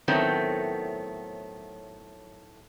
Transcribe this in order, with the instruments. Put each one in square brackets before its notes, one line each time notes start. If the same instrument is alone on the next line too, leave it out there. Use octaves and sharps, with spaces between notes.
[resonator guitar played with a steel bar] A2 D#3 F#3 A3 B3 C4